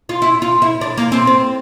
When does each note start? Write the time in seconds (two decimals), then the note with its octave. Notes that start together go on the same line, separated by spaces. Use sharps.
0.09 F4
0.22 E4
0.42 F4
0.62 E4
0.81 D4
0.97 A#3
1.12 C4
1.27 C4